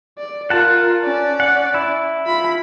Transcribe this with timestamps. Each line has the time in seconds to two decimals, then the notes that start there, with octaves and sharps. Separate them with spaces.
0.18 D5
0.50 F4 A#4 F#5 A5
1.04 C#4 D5
1.40 F#5
1.74 E4
2.26 F4 B5